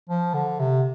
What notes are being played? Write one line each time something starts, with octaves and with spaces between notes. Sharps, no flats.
F3
D3
C3